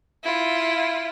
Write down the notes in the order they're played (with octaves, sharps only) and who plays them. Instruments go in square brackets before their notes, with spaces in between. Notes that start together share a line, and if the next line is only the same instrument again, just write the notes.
[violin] E4 F4